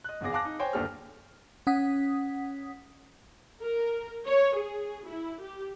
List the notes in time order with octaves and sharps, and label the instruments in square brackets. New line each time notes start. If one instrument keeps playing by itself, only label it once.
[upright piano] D#5 F#6
G#1 E2 C#3 G#4 D6 A#6
F5 G#5 A5 D6 F#6 A#6
D#4
C5 C#5 G5 G#5 C6
G1 D#2 D4 G4 A4 F6
[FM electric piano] C#4 F#5 D#6 B6
[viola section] A#4
C#5
G#4
E4
G4